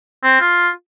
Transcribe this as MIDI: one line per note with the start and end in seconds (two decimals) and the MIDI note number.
0.23 0.40 60
0.40 0.68 65